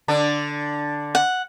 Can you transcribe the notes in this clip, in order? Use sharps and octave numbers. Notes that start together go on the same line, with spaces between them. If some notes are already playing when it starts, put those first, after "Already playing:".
D3 D4
F#5